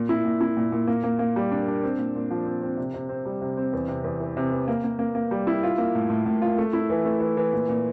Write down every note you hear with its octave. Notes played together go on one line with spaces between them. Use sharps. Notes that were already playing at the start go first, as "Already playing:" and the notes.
Already playing: A#2
E4
A#2
E4
A#2
A#2
A#3
A#3
A#3
G3
D4
D4
C4
A#2
A#2
F3
C4
C4
C3
C3
C4
G3
C3
C4
E2
C3
E2
E3
C3
E3
A#3
A#3
A#3
A#3
G3
E4
F4
A#3
A2
A2
A2
F4
A3
E4
E3
A3
E3
E3
A#2
A#2